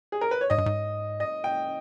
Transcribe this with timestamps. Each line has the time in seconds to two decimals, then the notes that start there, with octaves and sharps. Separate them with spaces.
0.12 G#4
0.21 A#4
0.31 B4
0.41 C#5
0.50 G#2 D#5
0.58 G2
0.66 G#2
1.20 D#5
1.44 G5